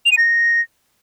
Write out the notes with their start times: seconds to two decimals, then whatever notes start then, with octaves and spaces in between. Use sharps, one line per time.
0.06 F7
0.12 D#7
0.18 A#6